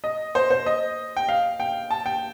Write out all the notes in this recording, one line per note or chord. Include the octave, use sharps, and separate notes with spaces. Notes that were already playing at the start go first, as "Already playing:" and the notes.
D#5
C5
C5
D#5
G5
F5
G5
A5
G5